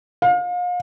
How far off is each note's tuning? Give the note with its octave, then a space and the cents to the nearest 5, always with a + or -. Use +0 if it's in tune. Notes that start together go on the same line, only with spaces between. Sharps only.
F5 +35